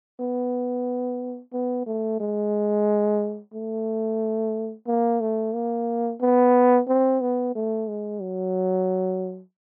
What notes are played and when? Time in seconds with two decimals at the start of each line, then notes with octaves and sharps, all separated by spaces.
0.20 B3
1.53 B3
1.87 A3
2.20 G#3
3.54 A3
4.87 A#3
5.21 A3
5.54 A#3
6.21 B3
6.88 C4
7.21 B3
7.55 A3
7.88 G#3
8.21 F#3